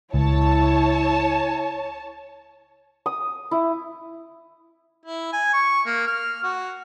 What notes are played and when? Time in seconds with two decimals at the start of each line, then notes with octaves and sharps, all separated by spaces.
0.14 C#2 E4 C#5 A5
3.06 D#6
3.51 E4
5.06 E4
5.33 G#5
5.53 C#6
5.86 A#3
6.07 F6
6.44 F#4